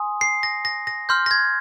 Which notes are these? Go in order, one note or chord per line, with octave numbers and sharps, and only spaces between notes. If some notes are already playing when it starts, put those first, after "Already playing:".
Already playing: G#5 C6 D#6
C7
A#6
A#6
A#6
C6 F6 G6
A#6
G#6